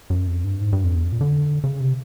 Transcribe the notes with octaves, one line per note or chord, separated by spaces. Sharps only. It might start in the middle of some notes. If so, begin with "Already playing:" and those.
F#2
F2
G2
G#2
G2
F2
E2
F2
A#2
D3
C#3
C3